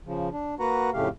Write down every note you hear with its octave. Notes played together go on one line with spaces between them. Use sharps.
C#3 F3
D4
A#3 F#4 B4 F#5 A#5
F2 A2 C#3 A3 G4 F5